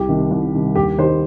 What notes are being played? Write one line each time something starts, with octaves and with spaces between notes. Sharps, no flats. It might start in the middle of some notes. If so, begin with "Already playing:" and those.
Already playing: C2 G4
C3 D#3
C2
C3 D#3
D#2 G4
D#3 G3 C5